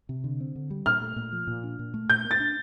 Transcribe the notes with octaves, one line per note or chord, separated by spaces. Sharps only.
C3
D3
C4
D3
G3
A#2 F6
A3
A#2
F3
A#2
D4
A#2
A3
A#2 G6
A#3
A6
D4